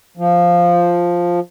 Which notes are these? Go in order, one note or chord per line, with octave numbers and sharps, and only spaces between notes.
F3